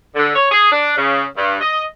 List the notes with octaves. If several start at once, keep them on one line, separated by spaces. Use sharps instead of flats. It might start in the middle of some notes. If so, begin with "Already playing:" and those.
D3
C#5
G#4
D4
C#3
G2
D#5